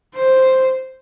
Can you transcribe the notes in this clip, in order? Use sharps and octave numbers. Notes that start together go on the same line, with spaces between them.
C5